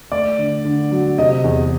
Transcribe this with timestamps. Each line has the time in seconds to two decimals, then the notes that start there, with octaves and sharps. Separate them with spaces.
0.12 A3 D5
0.38 D3
0.65 D3
0.91 F#3
1.18 C3 D#5
1.44 E2